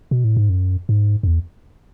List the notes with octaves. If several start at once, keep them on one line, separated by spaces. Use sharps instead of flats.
B2
A2
G#2
F#2
G#2
F#2
E2